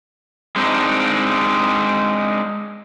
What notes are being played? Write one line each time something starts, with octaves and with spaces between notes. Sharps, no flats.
G#3 C4 D4 D#4